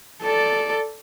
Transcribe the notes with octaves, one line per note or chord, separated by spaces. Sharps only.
A4 D5